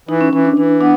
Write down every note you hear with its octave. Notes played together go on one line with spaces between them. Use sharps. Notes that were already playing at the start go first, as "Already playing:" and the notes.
E3 D#4
C#4
E3 C#4
D4
E3 D4
B3 D4